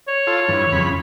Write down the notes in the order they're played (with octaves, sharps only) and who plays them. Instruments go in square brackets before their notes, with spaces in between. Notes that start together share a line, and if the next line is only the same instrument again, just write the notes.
[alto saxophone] C#5
[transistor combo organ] F4 A4
G2 E3
F2 C#3 B5